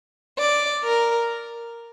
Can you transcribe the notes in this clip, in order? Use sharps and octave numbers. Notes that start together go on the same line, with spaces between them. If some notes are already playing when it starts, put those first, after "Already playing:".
D5
A#4